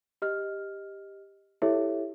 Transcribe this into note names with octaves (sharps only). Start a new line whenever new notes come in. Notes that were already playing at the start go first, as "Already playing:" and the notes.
G4 D#5 F6
E4 G4 A4 C#5 E5